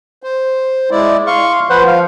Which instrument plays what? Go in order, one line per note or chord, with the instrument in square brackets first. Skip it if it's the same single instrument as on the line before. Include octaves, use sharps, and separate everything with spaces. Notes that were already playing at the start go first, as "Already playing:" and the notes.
[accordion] C5
G#3 E4 D5
[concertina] F5 C6 [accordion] C#6
[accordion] F3 [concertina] B4 C5 F#5
[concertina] F5